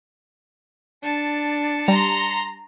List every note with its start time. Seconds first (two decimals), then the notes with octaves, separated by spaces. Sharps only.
1.03 D4 A5 C#7
1.88 G3 A#5 C6